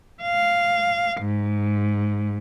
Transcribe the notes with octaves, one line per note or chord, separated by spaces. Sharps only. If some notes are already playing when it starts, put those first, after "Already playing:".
F5
G#2